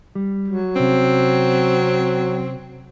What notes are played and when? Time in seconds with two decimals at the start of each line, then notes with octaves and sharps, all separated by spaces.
0.15 G3
0.48 F#3
0.76 C3 C4 C#4